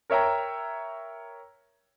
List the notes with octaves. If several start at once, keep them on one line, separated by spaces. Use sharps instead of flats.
A#4 C#5 E5 G5 A#5